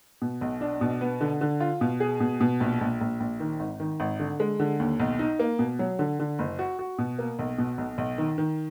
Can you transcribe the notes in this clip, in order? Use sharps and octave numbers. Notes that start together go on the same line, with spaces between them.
B2
B1
D4
B2
B3
D3
D3
F4
B2
G#4
B2
B2
A#1
A#1
A#1
A#1
D#3
G#1
D#3
G#1
D3
G#3
D3
D#2
B1
D#4
A#3
B2
F#3
D3
D3
F#1
F#4
F#4
B2
A#3
B1
B2
B1
B1
D#3
D#3